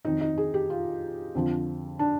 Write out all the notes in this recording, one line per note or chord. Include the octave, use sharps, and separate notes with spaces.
F2 D#3 D#4
D#4
G#4
G4
F4
F2 D3 F3
D4